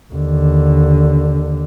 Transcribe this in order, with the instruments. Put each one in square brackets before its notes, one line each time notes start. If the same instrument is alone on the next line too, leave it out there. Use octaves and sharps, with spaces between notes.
[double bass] D#2 D3